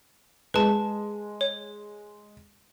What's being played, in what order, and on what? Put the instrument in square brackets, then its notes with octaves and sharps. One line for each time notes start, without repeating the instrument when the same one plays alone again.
[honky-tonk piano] G#3 [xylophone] B4 A5
[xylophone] C#5